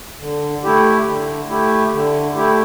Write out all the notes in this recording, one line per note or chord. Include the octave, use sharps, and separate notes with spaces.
D3
A3 E4 G4
D3
A3 E4 G4
D3
A3 E4 G4